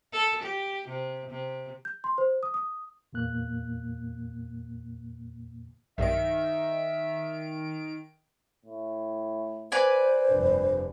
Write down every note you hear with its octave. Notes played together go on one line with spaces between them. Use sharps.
A4
G4
C3
C3
G6
C6
C5
D#6
D#6
E2 A#2 A#3 F#6
B1 G2 D#3 E5 D7
A2
B4 C5 D5 G#5
F1 G2 D4